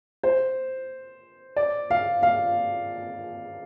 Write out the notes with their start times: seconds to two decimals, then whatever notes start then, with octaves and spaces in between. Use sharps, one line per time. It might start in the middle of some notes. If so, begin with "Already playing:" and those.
0.23 C5
1.56 D5
1.90 F5
2.23 F5